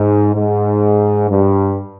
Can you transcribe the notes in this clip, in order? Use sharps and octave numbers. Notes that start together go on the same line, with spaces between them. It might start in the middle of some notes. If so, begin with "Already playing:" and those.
Already playing: G#2
G#2
G2